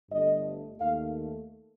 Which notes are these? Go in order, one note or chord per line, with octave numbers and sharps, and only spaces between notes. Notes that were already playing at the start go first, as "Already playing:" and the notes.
G1 G2 D3 A3 D#5
D#2 D#3 A3 F5